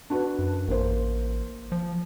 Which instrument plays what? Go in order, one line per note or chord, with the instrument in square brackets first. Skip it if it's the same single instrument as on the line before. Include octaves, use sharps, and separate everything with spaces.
[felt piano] D4 F#4 B4
[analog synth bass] F#2
[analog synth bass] A1 [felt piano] A#3 C5
[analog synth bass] F3